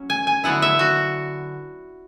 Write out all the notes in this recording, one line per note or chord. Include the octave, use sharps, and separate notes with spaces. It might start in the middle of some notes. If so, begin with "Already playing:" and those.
Already playing: F#3 C#4
G#5
G#5
D3 F#3 B3 E4 F#5
E5
F#4